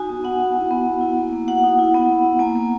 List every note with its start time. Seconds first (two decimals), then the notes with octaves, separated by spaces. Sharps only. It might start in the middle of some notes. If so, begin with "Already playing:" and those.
Already playing: D#4 F#4 G#5
0.09 B3
0.24 B3 F#5
0.40 F#4
0.55 E4
0.71 B3
0.86 B3
1.01 E4
1.17 A#3
1.33 A#3
1.48 F#4 F#5
1.64 D#4
1.79 E4
1.94 B3
2.09 B3
2.25 E4
2.39 A#3 G#5
2.55 A#3